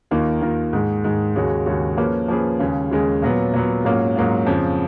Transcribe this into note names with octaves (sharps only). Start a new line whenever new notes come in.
D#2 D#3 A#3 F4 A#4
D#2 D#3 A#3 F4 A#4
G#2 D#3 G#3
G#2 D#3 G#3
D#2 C#3 G#3 C#4 F#4
D#2 C#3 G#3 C#4 F#4
F3 A#3 C#4 G#4 B4
F3 A#3 C#4 G#4 B4
D#2 C#3 G#3
D#2 C#3 G#3
A#2 F#3 B3
A#2 F#3 B3
G#2 F#3 A#3 C#4 F4
G#2 F#3 A#3 C#4 F4
F2 C#3 F3